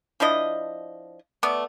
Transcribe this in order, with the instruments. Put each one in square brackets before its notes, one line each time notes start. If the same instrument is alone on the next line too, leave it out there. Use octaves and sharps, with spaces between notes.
[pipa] F3 D4 E4 D#5
A3 B3 D5